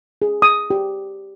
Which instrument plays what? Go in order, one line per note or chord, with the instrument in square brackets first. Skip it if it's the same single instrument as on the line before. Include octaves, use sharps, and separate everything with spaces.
[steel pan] G#4
D#6
G4